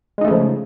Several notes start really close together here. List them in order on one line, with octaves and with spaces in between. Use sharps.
G#3 D#4 A3 C#3 F3